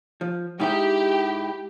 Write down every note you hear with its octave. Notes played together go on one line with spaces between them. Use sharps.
F3
G#2 D#4 E4 G4